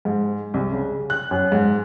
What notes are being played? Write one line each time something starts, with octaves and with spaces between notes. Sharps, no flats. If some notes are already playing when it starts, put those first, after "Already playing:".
G#2
C2
C#3
F#6
F#2
G#2